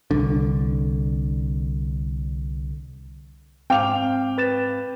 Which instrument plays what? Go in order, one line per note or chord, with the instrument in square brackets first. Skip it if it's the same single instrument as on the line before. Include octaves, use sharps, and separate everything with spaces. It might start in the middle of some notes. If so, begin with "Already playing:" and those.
[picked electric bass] C2 D3
[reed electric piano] G#2 C4 [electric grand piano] F5 [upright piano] G5 D6 F7
[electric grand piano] B4 A6 E7